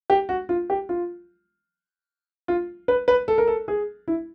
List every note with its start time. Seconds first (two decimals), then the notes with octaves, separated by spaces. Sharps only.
0.10 G4
0.29 F#4
0.49 F4
0.70 G4
0.89 F4
2.48 F4
2.88 B4
3.08 B4
3.28 A4
3.38 A#4
3.47 A4
3.68 G#4
4.08 E4